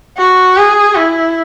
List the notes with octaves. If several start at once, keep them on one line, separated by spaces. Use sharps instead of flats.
F#4
G#4
E4